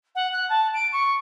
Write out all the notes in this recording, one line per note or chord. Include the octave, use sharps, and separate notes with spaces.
F#5
F#6
A5
D7
C#6